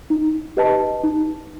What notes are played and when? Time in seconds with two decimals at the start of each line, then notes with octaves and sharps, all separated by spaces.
0.10 D#4
0.57 G4 B4 D#5 A5
1.04 D#4